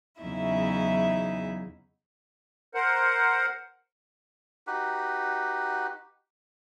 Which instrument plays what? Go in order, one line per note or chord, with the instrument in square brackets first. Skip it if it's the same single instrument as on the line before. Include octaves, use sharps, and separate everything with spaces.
[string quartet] E2 C#3 F#3 D#4 E4 E5
[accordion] A#4 C5 F#5
[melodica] D#4 F#4 G4 B4